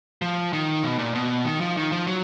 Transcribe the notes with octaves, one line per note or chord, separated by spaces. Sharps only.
F3
D#3
B2
A#2
B2
D#3
F3
D#3
F3
F#3